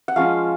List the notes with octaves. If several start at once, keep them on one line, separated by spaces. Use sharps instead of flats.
F#5
F3 G#3 C#4 F4 F5